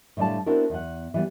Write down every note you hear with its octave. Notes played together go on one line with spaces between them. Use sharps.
A2 D3 G3 D5 F5 A5
B3 C4 D4 E4 F#4 A#4
E2 F#5
E3 G3 B3